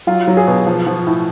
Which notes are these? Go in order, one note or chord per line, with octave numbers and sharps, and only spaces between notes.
F#3 F4
F#3
G#4
B2
F3
F3
A2